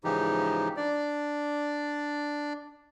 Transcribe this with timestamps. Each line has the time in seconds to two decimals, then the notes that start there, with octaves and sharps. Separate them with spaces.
0.04 G#2 C#3 E3 F3 D#4 G4
0.77 D4 D5